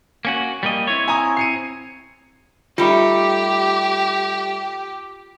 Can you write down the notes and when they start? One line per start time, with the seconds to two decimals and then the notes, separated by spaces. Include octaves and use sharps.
0.25 A#3 C#4 F#4
0.63 G3 A#3 D#5
0.87 C4 E4 C#5
1.08 G#5 A#5 D#6
1.37 C7 C#7 D#7
2.78 G3 A3 D#4 F4 G4 B5